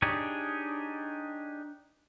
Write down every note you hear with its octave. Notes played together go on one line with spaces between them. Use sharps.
D4 D#4 G4 G#4 C#5